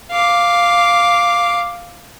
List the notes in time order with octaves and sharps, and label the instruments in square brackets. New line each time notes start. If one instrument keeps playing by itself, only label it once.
[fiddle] F5 D6